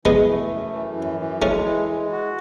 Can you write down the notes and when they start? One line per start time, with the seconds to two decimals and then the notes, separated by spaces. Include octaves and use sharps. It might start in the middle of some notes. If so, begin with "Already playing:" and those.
0.05 E3 G#3 B3
0.28 A3
0.50 F#2
0.74 E3
0.96 F#2
1.20 E3
1.42 G#3 A3 C#4
1.65 E3
1.88 G#3
2.11 F#4